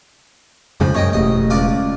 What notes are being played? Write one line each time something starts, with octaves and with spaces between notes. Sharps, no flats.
F2 C#3 F3 G#3
F#2 C#5 D#5 G5
E1 A1 D#5
C#2 F4 D5